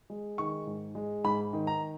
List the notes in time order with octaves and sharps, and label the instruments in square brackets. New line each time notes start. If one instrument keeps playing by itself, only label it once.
[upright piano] G#3
D#3 C#6
G#2
G#3
G#2 B5
D#3
A#5